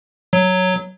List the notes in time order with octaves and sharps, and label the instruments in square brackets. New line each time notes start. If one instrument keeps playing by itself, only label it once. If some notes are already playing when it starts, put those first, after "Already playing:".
[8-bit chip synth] F#3